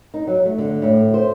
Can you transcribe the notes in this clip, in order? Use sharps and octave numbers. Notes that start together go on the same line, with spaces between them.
D#4
F#3
A3
D3
A2
C5